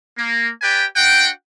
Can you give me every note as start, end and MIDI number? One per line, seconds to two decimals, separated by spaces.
0.17 0.49 58
0.61 0.84 67
0.61 0.84 71
0.61 0.84 74
0.61 0.84 79
0.61 0.84 80
0.96 1.29 62
0.96 1.29 66
0.96 1.29 78
0.96 1.29 79